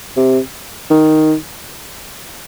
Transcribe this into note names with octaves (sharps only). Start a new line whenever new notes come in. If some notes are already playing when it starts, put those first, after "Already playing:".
C3
D#3